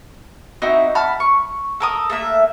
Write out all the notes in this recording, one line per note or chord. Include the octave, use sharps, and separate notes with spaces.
C4 D#4 E4 F#4
F#5 A5 B5 F6
C#6
A4 A#4 D#6
A3 A#3 E5